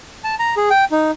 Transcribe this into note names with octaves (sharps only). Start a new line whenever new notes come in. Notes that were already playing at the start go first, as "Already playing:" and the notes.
A5
A#5
G#4
G5
D#4